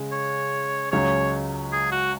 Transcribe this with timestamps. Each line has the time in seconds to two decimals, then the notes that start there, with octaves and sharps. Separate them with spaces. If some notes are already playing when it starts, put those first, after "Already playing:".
Already playing: C#3 G#3
0.12 C#5
0.92 C#2 C#3 F#3 C#4 C#5
1.72 G#4
1.92 F#4